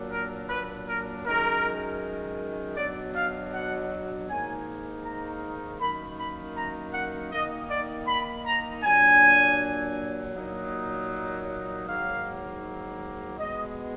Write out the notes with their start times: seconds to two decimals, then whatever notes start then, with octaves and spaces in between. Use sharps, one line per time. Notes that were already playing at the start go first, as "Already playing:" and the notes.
Already playing: A#2 F#3 A#3 D4
0.12 A#4
0.49 B4
0.88 A#4
1.26 F#2 D#3 G#3 A#4
2.77 B2 F#3 D4 D5
3.16 F5
3.53 F#5
4.29 G#2 D#3 A#3 D#4 G#5
5.04 A#5
5.80 F#2 D#3 A#3 B5
6.19 B5
6.57 A#5
6.94 F#5
7.32 D#3 A#3 D#4 D#5
7.70 D5
8.08 B5
8.46 A#5
8.83 A#2 F#3 D4 G#5
10.35 A#2 F#3 A#3 D#4
11.87 G#2 D#3 F#3 A#3 F5
13.39 B2 G#3 B3 D#5